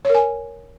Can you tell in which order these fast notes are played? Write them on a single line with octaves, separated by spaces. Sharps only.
C#5 A#4 G#5